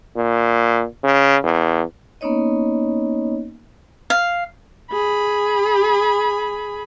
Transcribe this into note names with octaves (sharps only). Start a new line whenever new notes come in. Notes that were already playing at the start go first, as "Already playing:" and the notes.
A#2
C#3
E2
A#3 B3 C#4 D#4 C#5 D#5
F5
G#4 B5